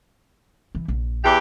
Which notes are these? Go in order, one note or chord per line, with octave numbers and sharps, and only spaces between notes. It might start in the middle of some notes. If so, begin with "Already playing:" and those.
E3
A#1
E2 E3 G4